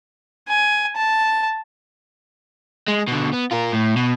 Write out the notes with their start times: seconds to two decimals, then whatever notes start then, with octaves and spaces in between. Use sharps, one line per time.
0.49 G#5
0.96 A5
2.88 G#3
3.07 B2 D3
3.33 B3
3.51 F4 A#4
3.72 A2
3.96 B2